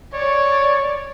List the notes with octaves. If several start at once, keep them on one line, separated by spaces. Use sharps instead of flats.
C#5 D5